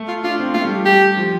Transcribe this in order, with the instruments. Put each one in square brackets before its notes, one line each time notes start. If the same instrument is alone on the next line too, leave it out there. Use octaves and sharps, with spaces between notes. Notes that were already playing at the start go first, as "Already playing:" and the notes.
Already playing: [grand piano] A3
[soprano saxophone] F4
[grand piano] D4 [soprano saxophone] F4
[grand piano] C4
[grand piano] A3 [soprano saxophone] F4
[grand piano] G3
G3
[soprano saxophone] G4
[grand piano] F3